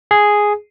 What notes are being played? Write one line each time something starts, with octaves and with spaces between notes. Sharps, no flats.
G#4